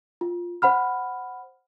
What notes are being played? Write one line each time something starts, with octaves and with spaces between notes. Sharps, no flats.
F4
C5 F#5 B5 F6